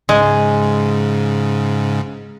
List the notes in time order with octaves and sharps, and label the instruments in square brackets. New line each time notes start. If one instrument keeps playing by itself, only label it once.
[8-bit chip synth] G#2 C#3 [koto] G#3